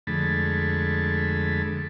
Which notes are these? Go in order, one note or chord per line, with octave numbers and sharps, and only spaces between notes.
F2 D3 G#3 A3 A5 B5